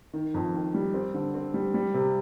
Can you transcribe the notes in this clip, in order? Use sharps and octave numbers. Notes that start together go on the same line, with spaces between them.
D#3
F2
D#3
G3
C4
D3
C4
G3
G3
C3